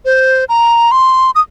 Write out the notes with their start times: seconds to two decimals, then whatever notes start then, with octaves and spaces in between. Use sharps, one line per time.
0.05 C5
0.49 A#5
0.91 C6
1.35 D#6